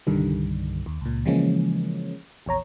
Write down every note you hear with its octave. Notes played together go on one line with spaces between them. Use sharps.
C2 G2 D3 D#3 G3
D#2
C#2 A#2
C#3 E3 F3 G#3 A#3 C#4
A#1 E2 C#5 A#5